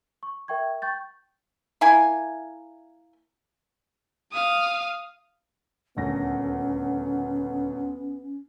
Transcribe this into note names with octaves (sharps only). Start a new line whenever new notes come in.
C#6
A#4 E5 G5 C#6 G#6
G5 C#6 G6 A6
A#3 E4 G#5
F5 D#6
D#1 D2 B3 C#4 A#6